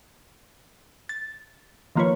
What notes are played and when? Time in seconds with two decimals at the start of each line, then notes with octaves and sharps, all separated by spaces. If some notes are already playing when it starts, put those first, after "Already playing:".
1.09 A6
1.96 D#3 F3 A#3 F4 B4 C#5